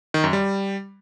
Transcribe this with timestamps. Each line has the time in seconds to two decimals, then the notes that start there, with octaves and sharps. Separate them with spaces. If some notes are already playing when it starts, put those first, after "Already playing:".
0.14 D#3
0.24 F#2
0.33 G3